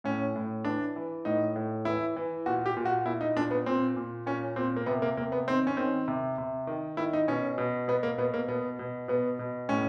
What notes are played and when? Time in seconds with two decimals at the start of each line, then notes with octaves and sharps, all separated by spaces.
0.04 A2 C#4
0.36 A2
0.65 E3 D4
0.96 E3
1.25 A2 D#4
1.56 A2
1.85 E3 E4
2.16 E3
2.46 A#2 F#4
2.66 G4
2.77 A#2
2.85 F#4
3.06 A#2 E4
3.21 D#4
3.37 A#2 D4
3.51 B3
3.66 A#2 C4
3.96 A#2
4.26 A#2 C#4
4.56 A#2 C4
4.76 A#3
4.86 C3 B3
5.02 A#3
5.17 C3 A#3
5.32 B3
5.47 D#3 C4
5.67 C#4
5.77 D#3 C4
6.08 C3
6.38 C3
6.67 D#3
6.97 D#3 E4
7.13 D#4
7.28 B2 C#4
7.58 B2
7.88 B2 B3
8.03 A#3
8.18 B2 B3
8.34 A#3
8.48 B2 B3
8.79 B2
9.08 B2 B3
9.39 B2
9.69 A2 C#4